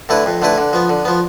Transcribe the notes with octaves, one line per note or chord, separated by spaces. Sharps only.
D3 A3 E4 B4
F2
D3 A3 E4 B4
D3
F3 B3
D3
F3 B3